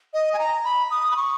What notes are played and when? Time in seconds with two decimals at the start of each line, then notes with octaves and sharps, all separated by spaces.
0.14 D#5
0.33 G#5
0.39 A#5
0.65 B5
0.91 D#6
1.11 B5
1.16 C#6